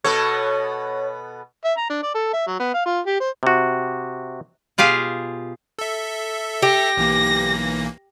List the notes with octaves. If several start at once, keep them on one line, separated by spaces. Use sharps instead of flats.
B2 B3 A4 C#5
E5
A#5
D4
D5
A4
E5
F#3
B3
F5
F4
G4
C5
C3 F#4
B2 F4 G4 G#4 F5
A4 E5
G4 A#6
B1 E3 A#3